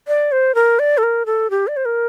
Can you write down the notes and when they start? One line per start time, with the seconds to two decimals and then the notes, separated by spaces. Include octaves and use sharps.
0.08 D5
0.32 C5
0.55 A#4
0.79 D5
0.98 A4
1.03 A#4
1.26 A4
1.50 G4
1.68 D5
1.77 C5
1.85 A#4